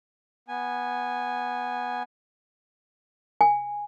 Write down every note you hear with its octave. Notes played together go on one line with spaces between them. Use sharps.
B3 G#5
G#5